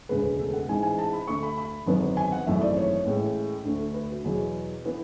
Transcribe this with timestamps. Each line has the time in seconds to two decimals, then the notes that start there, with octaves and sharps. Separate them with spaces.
0.09 E1 D2 C#3 G#3 B3 B4
0.39 A4
0.53 F#5
0.68 A1 G#2 E3 G#3 G#5
0.83 G#5
0.99 A5
1.13 B5
1.28 D2 D3 A3 C#6
1.43 B5
1.58 B5
1.87 G#1 F#2 D3 F#3 B3
2.17 G#5
2.32 F#5
2.47 G#1 F#2 E3 A3 E5
2.61 D5
2.77 C#5
3.05 A1 A2 G#3
3.65 D2 D3 A3
3.94 B4
4.10 F#4
4.24 E2 B2 F#3 G#4
4.85 E3 B3